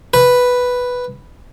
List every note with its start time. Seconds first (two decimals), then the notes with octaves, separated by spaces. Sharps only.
0.14 B4